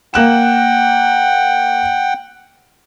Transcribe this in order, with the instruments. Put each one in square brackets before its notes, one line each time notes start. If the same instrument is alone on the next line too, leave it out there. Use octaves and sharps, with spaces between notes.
[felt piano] A#3 F#6 E7 [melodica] F#5 G5